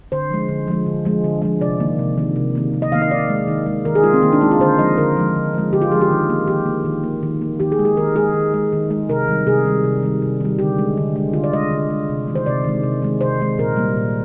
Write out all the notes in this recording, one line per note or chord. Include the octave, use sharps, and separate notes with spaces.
D3 C5
F3 G#3
D3
F3 G#3
D3
F3 G#3
D3
F3 G#3
C3 D5
D#3 A#3
C3
D#3 A#3
C3
D#3 A#3
C3
D#5
D#3 A#3 F5
D#5
D#3 D5
G#3
D#3
G#3
D#3 A#4
G#4
G#3 F4
C4
D#3 A#3
D4
G#3 D#4
F4
D3 C5
F3 G#3 D#5
D3 A#4
F3 G#3
D3
F3 G#3
D3 G4
F4
F3 G#3 G#4
G4
D#3
A#3
D#3 G4
A#3
D#3
A#3
D#3
A#3
D#3 G4
G#4
G#3
G#4
D#3 A#4
G#3 G#4
D#3
G#3
D#3
G#3
C3 A#4
D#3 G3
C3 G#4
D#3 G3
C3
D#3 G3
C3
D#3 G3
D3 G4
G#3
D3
G#3
D3 F4
D5
G#3 D#5
D3
G#3
C3
D#3 G#3
C5
C3 D5
D#3 G#3
C3
D#3 G#3
C3 C5
D#3 G#3
A#2 A#4
G3 A#3
A#2